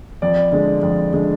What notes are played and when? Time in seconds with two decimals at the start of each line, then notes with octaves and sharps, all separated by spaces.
0.22 F2 D5
0.52 D3 G#3
0.83 F2
1.13 D3 G#3